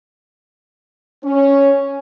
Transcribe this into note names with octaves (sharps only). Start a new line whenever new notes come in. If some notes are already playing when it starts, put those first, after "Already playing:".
C#4